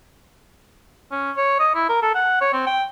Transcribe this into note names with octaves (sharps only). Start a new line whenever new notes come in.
C#4
C#5
D#5
E4
A#4
A4
F#5
C#5
C4
G5